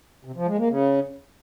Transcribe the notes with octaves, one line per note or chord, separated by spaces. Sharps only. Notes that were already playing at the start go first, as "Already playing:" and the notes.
C3
F3
G#3
A#3
C#3